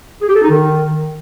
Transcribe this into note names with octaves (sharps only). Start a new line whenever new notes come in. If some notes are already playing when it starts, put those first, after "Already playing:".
G#4
G4
A4
D#4
D#3